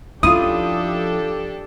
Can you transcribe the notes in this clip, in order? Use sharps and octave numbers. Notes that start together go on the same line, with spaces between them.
F3 C#4 D4 E4 F4 G4 A4 D#6